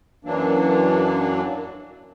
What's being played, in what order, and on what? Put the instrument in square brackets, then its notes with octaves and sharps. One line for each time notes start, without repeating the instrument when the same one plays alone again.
[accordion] F#2 E3 F#3 A#3 D4